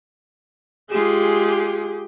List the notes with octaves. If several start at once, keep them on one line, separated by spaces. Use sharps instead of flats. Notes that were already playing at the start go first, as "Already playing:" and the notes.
G#3 F4 G4 G#4